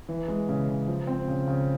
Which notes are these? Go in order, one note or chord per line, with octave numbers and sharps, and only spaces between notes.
E3
G#3
C#3
C#3
F3
C4
C#3
C#3